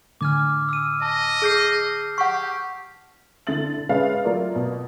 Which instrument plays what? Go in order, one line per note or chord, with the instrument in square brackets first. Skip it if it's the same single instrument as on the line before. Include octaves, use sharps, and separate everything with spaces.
[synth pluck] A2 D3 G#5 [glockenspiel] D6 F6
[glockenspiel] E6 F6 D#7
[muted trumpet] D#5 [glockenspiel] A5
[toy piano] G#4 [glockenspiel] F6 G6 C7
[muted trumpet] G4 [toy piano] F#5 C#6
[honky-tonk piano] D3 E4 A6 F#7
G#3 C#4 B4 E5 F5
F#3 A3 A#3 F4 A#4 D5
B2